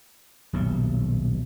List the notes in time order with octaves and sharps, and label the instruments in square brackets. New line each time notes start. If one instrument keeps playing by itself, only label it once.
[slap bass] D#1 B1 C3